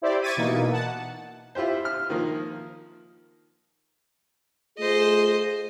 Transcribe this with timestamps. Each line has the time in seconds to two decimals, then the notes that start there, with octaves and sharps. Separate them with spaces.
0.02 E4 G4 C5 D5
0.22 C#6 D6 G#6 A6 B6 D#7
0.37 B2 E3 A#3 D#4
0.71 F#5 A5
1.55 E4 F4 G4 C5
1.85 F6
2.10 D#3 F3 A#3
4.78 A3 F4 G#4 C5 D#5